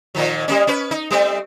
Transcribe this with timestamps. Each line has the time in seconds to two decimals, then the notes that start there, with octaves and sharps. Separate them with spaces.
0.15 A#2 D#3 F3
0.48 G3 A#3 C#4
0.67 C#4 B4
0.91 D#4
1.11 G3 A3 C4